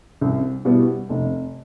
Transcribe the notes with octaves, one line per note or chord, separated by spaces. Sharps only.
C2
B2 G3 B3 E4
F1